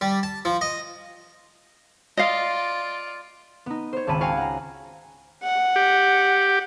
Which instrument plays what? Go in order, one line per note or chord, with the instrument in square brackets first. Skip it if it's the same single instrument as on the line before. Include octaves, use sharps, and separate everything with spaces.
[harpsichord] G3
A5
F3
D#5
[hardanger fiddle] F4 D5 [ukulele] D#5 F5
[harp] B3 D#4
C5 C#5
G#1 C#2 C#5 A5 B5 D#7
F#4 C#5 F5 G5 G#5
F#5 A#5
[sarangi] F#5
[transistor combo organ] G4